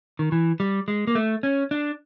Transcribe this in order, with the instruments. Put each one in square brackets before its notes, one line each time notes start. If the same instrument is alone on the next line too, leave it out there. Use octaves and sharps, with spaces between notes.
[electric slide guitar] D#3
E3
G3
G#3
A#3
A3
C#4
D4